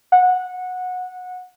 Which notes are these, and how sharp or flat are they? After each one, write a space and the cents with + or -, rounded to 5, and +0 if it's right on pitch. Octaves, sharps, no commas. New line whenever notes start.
F#5 -15